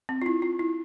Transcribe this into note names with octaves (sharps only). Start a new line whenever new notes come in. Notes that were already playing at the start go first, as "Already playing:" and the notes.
C4
F4
E4
F4
E4